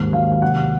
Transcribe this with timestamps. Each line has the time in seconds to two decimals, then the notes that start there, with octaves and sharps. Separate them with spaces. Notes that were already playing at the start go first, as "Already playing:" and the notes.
Already playing: D#2 G#2
0.13 F#3 F5
0.32 F5
0.42 C3 F#5